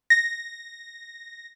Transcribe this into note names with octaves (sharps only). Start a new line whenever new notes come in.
A#6